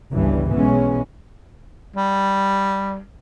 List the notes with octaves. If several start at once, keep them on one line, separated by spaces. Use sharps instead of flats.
G1 C#2 G2 E3
B1 E3 G#3 B3 C#4
G3